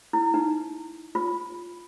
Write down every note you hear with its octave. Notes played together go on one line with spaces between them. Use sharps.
E4
D#4
F4